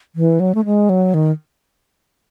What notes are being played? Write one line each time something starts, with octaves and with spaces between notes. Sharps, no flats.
E3
F#3
A3
G#3
F#3
D#3